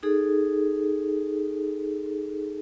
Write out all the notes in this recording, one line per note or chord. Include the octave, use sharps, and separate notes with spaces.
D#4 G#4 A4